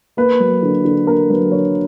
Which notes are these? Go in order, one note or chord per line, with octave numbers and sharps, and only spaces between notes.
A#3 B4
F#3
D3
D3
A#3 A#4
F#3 B4
D3 C#5